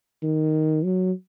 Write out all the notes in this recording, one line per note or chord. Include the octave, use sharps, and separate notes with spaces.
D#3
F#3